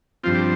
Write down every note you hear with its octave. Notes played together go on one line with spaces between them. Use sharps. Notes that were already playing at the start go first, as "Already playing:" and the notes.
G2 F3 C4 F4
G4